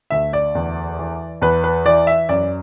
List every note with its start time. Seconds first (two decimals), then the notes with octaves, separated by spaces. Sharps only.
0.10 D2 E5
0.33 D5
0.55 E2
0.99 E3
1.42 E2 B4
1.64 B4
1.85 E3 D5
2.07 E5
2.29 F#2 D5